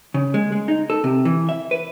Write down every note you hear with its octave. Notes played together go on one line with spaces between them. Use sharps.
C#3
G#3
G#3
D#4
A4
C3
E3
E5
B4